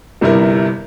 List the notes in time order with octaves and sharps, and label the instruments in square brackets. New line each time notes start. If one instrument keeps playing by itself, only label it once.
[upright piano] G1 G2 C3 E4 A#4